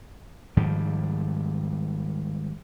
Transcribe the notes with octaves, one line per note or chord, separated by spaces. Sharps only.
G#2 D#3 F3 G3